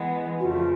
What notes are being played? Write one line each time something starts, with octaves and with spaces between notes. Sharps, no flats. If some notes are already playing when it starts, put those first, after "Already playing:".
Already playing: E3 G#3 B3
F2 C#3 F3 A3 F4 F#4